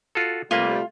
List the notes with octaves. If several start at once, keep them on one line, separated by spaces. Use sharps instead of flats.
F4 F#4 A4
C3 G3 A3 A#3 F4 B4 G#5